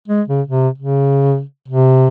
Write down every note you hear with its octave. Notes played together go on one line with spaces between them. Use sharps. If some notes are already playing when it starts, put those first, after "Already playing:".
G#3
C#3
C3
C#3
C3